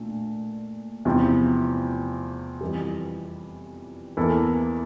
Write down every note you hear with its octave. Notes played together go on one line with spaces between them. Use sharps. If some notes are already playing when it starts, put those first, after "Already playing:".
Already playing: A#2 A3 D4
E2 C3 F3 C4 E4
F2 E3 G3
E2 E3 A#3 E4 A4